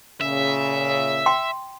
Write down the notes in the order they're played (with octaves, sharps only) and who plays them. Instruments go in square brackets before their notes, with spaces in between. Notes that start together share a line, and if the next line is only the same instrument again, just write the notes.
[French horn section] A#2 C#3 [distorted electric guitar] E5
[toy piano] G5 C6